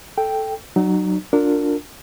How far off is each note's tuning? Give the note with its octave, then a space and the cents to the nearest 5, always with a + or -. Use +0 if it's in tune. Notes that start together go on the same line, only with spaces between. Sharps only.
A4 -5 G5 +0
F#3 +15 D#4 -40
D4 -10 F4 +25 A#4 -25